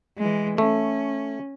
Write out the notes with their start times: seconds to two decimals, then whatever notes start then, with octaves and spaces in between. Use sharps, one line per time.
0.18 E3 G#3
0.58 A3 C#4